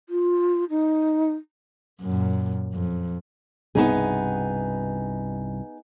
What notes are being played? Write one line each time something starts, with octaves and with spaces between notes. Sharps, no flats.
F4
D#4
F#2 A#2
F2
C2 G2 B2 B3 D#4 G#4